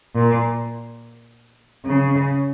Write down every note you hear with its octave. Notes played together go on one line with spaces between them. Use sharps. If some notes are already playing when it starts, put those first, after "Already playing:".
A#2
C#3